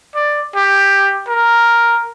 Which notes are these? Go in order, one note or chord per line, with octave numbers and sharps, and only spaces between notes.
D5
G4
A#4